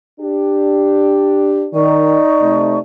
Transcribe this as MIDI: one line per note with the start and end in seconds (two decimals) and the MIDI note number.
0.21 1.67 62
0.21 1.67 67
1.73 2.18 51
1.73 2.78 63
1.73 2.78 74
1.73 2.78 85
2.41 2.78 48
2.41 2.78 57